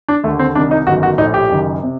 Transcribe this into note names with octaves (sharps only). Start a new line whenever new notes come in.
D4
D#2 D3 A3
C4
C2 C3 D#3 D4
D#4
G1 F#2 D#3 F#4
F#4
A#1 A2 D#4
G4
F#1 F#2 D#3
C3